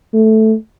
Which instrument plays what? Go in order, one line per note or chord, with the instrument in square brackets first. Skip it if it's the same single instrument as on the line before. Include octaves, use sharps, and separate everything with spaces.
[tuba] A3